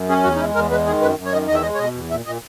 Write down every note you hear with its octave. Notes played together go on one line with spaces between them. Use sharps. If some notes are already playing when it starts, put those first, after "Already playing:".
Already playing: F#2
C#4 G#4
E2 F#4
D#4
G#3 E4
E2 A#4
G#3 B4
D#3 G#4
F#2 B4
F#2
C#5
D#3 D#5
E2 D#5
E5
G#3 D#5
C#5
B2 D#5
E2
A#2 E5
A#2 D#5